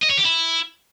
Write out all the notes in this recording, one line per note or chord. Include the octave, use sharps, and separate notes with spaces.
D#5
C#5
G4
E4